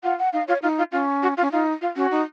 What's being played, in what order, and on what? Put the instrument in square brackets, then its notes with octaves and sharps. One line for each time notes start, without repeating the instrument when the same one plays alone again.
[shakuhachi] F4 [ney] F#5
[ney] F#5
[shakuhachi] D#4 [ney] F5
[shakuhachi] F4 [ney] C#5
[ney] D#4 [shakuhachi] F4
[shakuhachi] F4
[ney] C#4 [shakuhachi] F4
[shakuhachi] F#4
F4
[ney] C#4
[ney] D#4 [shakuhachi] F4
[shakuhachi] F4
[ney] C#4 [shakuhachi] F#4
[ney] D#4